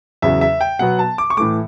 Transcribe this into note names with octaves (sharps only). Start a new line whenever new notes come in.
E2 C#3 F#3 E5
E5
G5
B2 F#3 B3 F#5
A5
D6
C#6
A2 E3 A3 D6